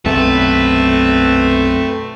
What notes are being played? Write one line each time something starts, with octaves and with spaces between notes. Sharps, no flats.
B1 F#2 C3 A3 C4 B4